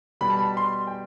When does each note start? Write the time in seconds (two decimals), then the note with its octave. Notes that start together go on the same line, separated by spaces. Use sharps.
0.21 B2 G3 B5
0.30 A5
0.39 B5
0.57 C6
0.87 G5